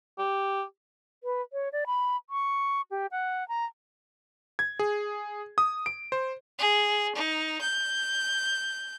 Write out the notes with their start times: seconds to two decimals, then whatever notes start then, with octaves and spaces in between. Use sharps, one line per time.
0.18 G4
1.24 B4
1.53 C#5
1.72 D5
1.86 B5
2.30 C#6
2.91 G4
3.11 F#5
3.48 A#5
4.59 G#6
4.79 G#4
5.58 D#6
5.86 D7
6.12 C5
6.59 G#4
7.15 D#4
7.61 G6